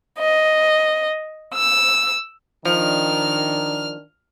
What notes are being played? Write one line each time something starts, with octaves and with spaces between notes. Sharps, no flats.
D#5
E6
D#3 F3 D4 F6